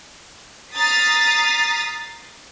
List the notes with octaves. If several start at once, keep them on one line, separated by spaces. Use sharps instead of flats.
A#5 D#6 F6 A6 B6 C7